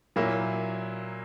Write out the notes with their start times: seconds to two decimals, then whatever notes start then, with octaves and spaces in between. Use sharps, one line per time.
0.16 A#2 F#3 A#3 E4